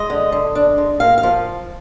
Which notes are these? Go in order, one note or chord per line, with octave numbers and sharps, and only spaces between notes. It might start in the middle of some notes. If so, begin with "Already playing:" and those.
Already playing: G#3 D#5
D3
D3
D4
G#3
A#3 F5
F5
F3